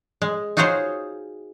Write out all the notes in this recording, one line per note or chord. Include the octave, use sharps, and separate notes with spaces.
G#3
D#4 F4 F#4 G#4 C5 C#5